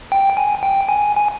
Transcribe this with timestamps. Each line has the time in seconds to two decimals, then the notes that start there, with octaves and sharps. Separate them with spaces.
0.12 G5
0.37 G#5
0.63 G5
0.89 G#5
1.17 G#5